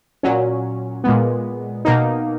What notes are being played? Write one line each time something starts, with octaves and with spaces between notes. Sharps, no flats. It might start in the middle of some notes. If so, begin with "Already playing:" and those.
A#2 F#3 C#4
A#2 G#3 B3
B2 A#3 D#4